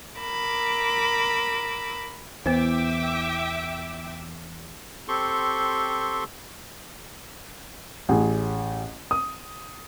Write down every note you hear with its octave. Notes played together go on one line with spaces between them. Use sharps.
A#4 B5 D6 E6
E2 E3 B3 C5 E5 G5 D6
C4 G4 A4 C6 C#6
A1 G#4
D#6